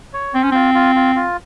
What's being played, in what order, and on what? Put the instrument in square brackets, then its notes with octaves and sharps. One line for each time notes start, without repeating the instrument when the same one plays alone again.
[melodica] C#5
[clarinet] C4 [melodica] C5
[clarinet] C#4
[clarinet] C4 [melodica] F4
[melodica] F4
F4
F4